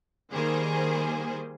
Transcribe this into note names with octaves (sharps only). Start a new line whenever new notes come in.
D#3 G3 A#3 G#4 C5